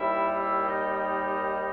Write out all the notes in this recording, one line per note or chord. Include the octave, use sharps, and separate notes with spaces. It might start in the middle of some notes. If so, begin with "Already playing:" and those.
Already playing: D#2 D#3 G3 E4 E5
E4 E5
D#4 D#5
D#4 D#5